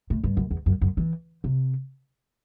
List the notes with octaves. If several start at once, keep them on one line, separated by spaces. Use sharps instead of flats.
A2
G2
F#2
E2
F#2
F#2
E3
C3